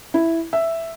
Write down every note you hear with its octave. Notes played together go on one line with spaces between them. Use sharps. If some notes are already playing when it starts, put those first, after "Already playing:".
E4
E5